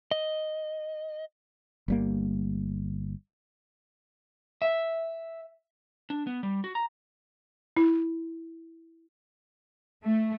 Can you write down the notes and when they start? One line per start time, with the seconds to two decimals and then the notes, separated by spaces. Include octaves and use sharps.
0.11 D#5
1.88 G1 G3 A#3
4.62 E5
6.10 D4
6.27 B3
6.43 G3
6.64 F#4
6.75 A#5
7.77 E4
10.03 A3